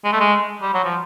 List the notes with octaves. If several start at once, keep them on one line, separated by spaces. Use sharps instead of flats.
G#3
A3
G#3
G3
F#3
F3